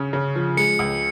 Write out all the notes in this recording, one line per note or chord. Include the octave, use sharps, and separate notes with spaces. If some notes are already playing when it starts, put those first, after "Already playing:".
Already playing: C#3 C#4
C#3
F3
G#3 C#7
C#2